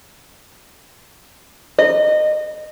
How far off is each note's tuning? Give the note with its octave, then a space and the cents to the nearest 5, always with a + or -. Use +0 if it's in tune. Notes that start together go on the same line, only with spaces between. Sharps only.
D#5 -25